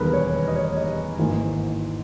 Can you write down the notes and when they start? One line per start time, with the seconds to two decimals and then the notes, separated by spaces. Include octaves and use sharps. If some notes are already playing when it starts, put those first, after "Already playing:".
Already playing: E1 D#2 D#3 G3 B3 G#4 A#4 B4
0.13 C#5
0.35 B4
0.48 D#5
0.56 C#5
0.77 D#5
1.19 G#1 G#2 E3 A#3